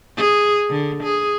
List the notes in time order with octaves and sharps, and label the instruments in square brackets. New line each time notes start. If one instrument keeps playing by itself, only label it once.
[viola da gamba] G#4
D3
G#4